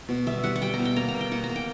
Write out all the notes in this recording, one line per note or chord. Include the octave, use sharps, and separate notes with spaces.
B2
G3 E5
G3 F#5
F#5
G3 G5
A#5
B2
G5
A#3 A#5
A#5
B2
G5
A#3 F#5
A#5
A#3
G5